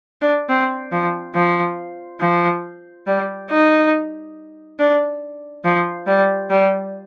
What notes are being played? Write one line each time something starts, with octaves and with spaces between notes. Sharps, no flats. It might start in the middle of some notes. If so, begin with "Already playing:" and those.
D4
C4
F3
F3
F3
G3
D#4
D4
F3
G3
G3